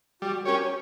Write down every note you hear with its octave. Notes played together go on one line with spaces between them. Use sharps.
G3 F#4
C#4 G4 A#4 C#5
C#5